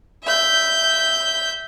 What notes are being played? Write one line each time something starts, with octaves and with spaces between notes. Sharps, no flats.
E5 G6